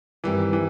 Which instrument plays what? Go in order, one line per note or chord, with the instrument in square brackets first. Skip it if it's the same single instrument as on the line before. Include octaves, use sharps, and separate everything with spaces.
[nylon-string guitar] G2 D#3 G3 C4 [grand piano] E3
[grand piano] E3